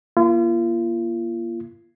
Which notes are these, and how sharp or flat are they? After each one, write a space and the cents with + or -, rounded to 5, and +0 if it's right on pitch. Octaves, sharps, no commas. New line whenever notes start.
A#3 +20 F4 -40